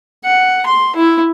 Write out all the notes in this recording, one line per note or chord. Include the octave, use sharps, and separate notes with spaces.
F#5
C6
E4